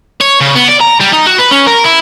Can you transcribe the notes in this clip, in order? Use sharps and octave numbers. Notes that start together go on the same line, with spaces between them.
C#5
C#3
B3
D5
A#5
G3
D#4
F#4
B4
C#4
A#4
E4